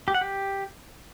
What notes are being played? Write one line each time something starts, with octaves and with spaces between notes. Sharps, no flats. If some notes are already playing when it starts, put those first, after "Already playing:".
G4
F#5
G4